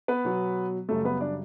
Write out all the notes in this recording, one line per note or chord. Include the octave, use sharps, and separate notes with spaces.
B3 B4
B2 F#3
F#2 C#3 G3 A3 A4
B3 B4
D4 D5